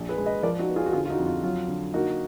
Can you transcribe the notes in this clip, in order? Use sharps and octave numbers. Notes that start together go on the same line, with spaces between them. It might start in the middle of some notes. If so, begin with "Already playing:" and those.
Already playing: A#1
G#4 B4
G#3
B4 D#5
F3 A#4 D5
D#4 F#4
B3
F4 G#4
F#4
D3 F4 G#4
F4
D#4 F#4
F2
F4
F#3 F4
D3
A#3 D#4 F#4